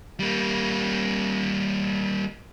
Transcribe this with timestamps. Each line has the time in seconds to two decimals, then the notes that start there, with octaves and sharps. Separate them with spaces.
0.20 G3 A#3